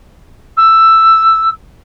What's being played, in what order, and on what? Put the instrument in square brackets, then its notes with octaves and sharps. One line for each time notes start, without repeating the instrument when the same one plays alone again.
[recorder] E6